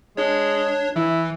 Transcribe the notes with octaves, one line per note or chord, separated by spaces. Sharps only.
G#3 D4 C#5
E3 E4